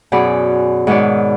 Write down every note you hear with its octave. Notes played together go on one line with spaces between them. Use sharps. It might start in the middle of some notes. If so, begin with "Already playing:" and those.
F#2 B2 B3 G#4 D5 B5
G#2 B2 D#3 B4 C#5 D5